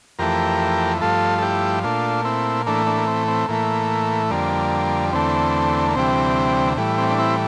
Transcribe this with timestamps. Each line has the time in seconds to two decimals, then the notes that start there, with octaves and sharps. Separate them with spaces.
0.19 F2 E3 A3 G4 A#4
1.01 G2 F3 A3 F4 A4
1.38 A4
1.42 E4 G4
1.84 A#2 A3 D4 F4
2.25 C4 E4
2.66 A2 E3 A3 A#3 D4
2.87 A#3 D4
2.97 A#3
3.08 C4
3.28 C4
3.48 A2 E3 A3 A#3
4.30 F2 D3 G3 A#3
5.13 E2 D3 A3 C4
5.89 A#3
5.95 D2 C3 E3 G3 C4
6.77 A2 E3 G3
6.98 C4
7.11 D4
7.18 C4 E4